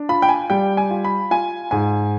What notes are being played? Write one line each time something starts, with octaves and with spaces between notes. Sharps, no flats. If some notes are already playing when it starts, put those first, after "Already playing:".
Already playing: D4
F4 B5
G5
G#5
G3 G5
G#5
F4
B5
F4 G#5
G#2 G#5